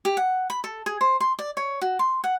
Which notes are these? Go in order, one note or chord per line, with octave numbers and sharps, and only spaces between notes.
G4
F#5
B5
A4
G#4
C5
C6
D5
C#5
F#4
C6
F#5